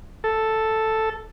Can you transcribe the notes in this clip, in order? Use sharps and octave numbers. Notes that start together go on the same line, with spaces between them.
A4